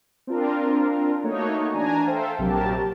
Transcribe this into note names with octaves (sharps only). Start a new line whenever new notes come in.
C4 D4 F4 A#4
A3 A#3 D#4 F#4 C#5
E3 D4 G#5 A#5
A4 C5 E5 F5 G5
A#1 C3 F#3 G4 A#4 A5